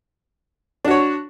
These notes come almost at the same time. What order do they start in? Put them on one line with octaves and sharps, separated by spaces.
D4 F#4 C#5